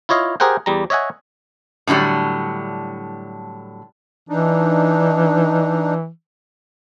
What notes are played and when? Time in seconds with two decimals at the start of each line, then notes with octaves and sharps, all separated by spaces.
0.09 E4 F4 C#5 D#5 F5
0.40 G4 G#4 A#4 C5 F#5 G5
0.66 E2 G3 A#5
0.90 C#5 D#5 E5 F#5 G#5
1.87 A2 D3 E3 F#3 G3
4.29 E3 D4 D#4